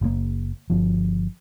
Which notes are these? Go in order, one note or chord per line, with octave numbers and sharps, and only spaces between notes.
F#1 A2 A#3
G1 F3